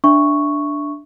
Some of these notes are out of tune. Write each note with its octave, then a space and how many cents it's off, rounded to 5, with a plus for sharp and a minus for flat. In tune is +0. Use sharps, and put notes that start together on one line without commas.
D4 +0 E5 +10 C#6 +0